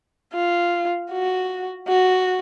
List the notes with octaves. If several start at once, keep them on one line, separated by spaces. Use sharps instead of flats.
F4
F#4
F#4